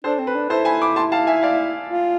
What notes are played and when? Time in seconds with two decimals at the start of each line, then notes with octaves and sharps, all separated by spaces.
0.04 D4 A4 C5
0.19 C4
0.27 B4
0.35 D4
0.50 E4 A4 C5
0.65 G#5 B5
0.81 B5 D6
0.96 A5 C6
1.12 F5 A5
1.27 E5 G#5
1.43 D5 F5
1.89 F4